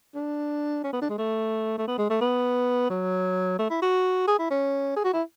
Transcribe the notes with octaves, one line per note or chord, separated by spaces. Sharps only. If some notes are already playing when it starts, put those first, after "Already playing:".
D4
C#4
B3
D4
G#3
A3
A3
B3
G#3
A3
B3
F#3
A3
E4
F#4
G#4
E4
C#4
G#4
F#4
E4